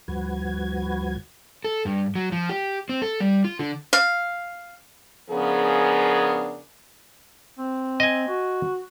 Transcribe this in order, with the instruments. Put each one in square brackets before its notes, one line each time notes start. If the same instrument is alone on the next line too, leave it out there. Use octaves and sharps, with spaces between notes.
[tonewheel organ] D2 G2 F3 F#4 B4 G#6
[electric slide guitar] A4
G2
F#3
F3
G4
C4
A4
G3
F4
D3
[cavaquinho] F5
[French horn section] C#3 F3 B3 D4 G#4 A#4
[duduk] C4
[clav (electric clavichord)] D#5 G#5
[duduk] F#4